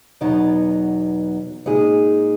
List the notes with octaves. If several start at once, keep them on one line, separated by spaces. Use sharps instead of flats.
E2 B2 F#3 B3 D#4
A#2 G#3 D#4 G#4